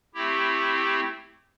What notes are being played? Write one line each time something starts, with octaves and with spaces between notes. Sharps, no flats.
A3 C4 E4 G4